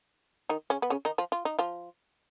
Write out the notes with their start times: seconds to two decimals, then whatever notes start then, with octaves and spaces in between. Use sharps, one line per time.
0.49 D#3 D#4
0.70 C#3 C#4
0.82 B3
0.90 C#3 C#4
1.05 D#3 D#4
1.18 F3 F4
1.32 F4
1.45 D#4
1.59 F3 F4